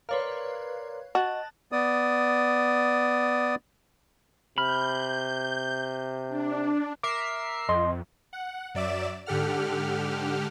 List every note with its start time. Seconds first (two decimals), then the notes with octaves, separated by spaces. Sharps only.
0.09 A#4 B4 C#5 D5 F5 C6
1.15 F#4 D#5 A5 F#6 A6
1.72 B3 D5 D#6
4.58 C3 B5 F6 G6
6.28 D4
7.03 A#4 E5 D6 C7
7.69 F2 D#5 C6
8.33 F#5
8.75 F#2 F#3 D5 E5 D6 E7
9.26 G#2 D3 G4 A4 F#5 F6